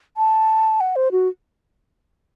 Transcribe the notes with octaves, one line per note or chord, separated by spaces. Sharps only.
A5
F#5
C5
F#4